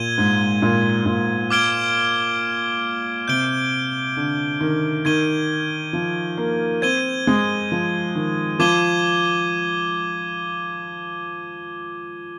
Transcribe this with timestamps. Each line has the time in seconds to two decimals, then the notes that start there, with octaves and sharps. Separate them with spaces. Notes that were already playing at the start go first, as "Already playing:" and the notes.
Already playing: A#2 G#6 D#7 G7
0.18 G#2
0.62 A#2
1.06 A#2
1.50 D6 F6 G#6 D7 G7
3.28 C3 G6 D7 G7
4.17 D3
4.61 D#3
5.05 D#3 G#6 D#7 G7
5.93 F3
6.37 A#3
6.82 C4 G#6 D#7 G7
7.27 G#3
7.72 F3
8.15 D#3
8.59 F3 D6 G#6 D#7 G7